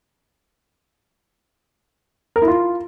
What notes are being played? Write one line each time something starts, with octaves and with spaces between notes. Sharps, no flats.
A#4
E4
F4